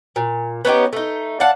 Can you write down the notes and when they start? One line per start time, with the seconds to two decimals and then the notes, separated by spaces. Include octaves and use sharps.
0.16 A#2
0.65 B3 C#4 D#4 G4
0.93 A3 D#4
1.40 D5 F5 F#5 A5